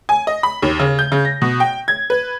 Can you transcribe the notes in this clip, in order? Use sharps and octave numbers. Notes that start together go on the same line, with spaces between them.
G#5
D#5
B5
D#2
C#3
G6
C#3
A#6
B2
G5
G#6
B4